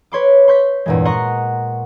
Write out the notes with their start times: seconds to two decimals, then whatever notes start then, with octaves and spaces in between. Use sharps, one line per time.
0.12 B4 C#5 C6 D6
0.48 C6 C#6 G6 B6
0.86 E2 G2 A#2 E3 G#3
1.05 D#5 F#5 A#5 C6 C#6 F#6